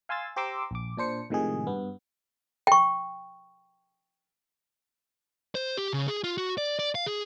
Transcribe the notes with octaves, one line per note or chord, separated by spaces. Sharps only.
F5 G#5 C6 E6 A6
G4 C5 A#5 C6 D6 E6
A#1 D6
A#2 D4 C5 C#7
A2 C3 D#3 F3 G#3 G#4
G2 B3
G5 C#6
C5
G4
C#3
G#4
F4
F#4
D5
D5
F5
G#4